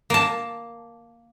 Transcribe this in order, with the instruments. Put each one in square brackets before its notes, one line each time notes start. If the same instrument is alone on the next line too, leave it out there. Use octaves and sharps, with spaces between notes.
[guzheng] A#3 A5